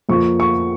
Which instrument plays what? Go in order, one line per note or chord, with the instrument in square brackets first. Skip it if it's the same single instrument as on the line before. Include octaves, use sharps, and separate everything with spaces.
[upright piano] F2 F3 A#3 C#6
C#6